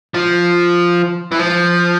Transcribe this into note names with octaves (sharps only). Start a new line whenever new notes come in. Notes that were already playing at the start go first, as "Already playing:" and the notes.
F3
E3
F3